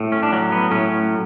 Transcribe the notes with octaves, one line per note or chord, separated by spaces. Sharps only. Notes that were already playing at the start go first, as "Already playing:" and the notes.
Already playing: A2
C#4
D4
F#3 C#4
B3
A2 C#4